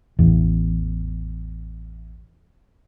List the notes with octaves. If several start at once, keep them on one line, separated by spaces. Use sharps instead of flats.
A1 E2